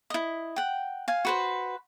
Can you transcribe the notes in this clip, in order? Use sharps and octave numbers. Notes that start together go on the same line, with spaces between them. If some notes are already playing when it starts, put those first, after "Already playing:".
E4 D#5
F#5 G5
F5 G#5
F#4 B4 C5